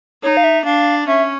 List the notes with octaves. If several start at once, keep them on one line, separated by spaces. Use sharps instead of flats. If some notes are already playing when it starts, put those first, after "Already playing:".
D#4 C#5
F5
E5
D4 F5
C#4 E5